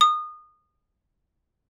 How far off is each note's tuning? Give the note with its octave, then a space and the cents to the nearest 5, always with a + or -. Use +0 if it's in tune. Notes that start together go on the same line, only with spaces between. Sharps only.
D#6 -25